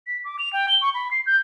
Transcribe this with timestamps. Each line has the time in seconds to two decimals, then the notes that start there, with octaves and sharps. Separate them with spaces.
0.07 B6
0.24 D6
0.39 F7
0.53 G5
0.68 G7
0.81 C#6
0.94 B5
1.11 C7
1.26 G6